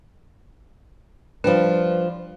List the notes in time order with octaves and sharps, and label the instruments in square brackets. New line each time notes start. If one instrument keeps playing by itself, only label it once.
[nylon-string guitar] F3 G3 D4 [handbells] B4